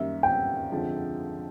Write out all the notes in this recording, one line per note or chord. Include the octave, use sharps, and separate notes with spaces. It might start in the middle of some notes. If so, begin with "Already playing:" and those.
Already playing: F#2 D#3 G3 A#3 E5
G5
F2 D3 F3 G#3